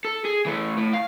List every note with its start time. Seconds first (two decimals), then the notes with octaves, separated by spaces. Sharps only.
0.05 A4
0.25 G#4
0.46 E3 A3
0.78 A2
0.94 F5